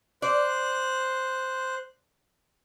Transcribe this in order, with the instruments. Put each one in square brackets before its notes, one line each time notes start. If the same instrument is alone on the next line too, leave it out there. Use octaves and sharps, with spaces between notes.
[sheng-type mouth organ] C5 F#6 [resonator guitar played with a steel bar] D5